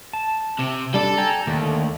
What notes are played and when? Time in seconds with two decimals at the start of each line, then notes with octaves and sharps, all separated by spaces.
0.13 A5
0.59 C3
0.94 G3 D4 A4
1.18 G5 G#5 A#5
1.47 D#2 D3 A3